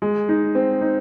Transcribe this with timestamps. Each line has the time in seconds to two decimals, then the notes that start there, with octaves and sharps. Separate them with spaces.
0.02 G#3
0.29 D#4
0.55 C4
0.81 D#4